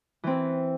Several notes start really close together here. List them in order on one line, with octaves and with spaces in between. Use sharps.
E3 C4 E4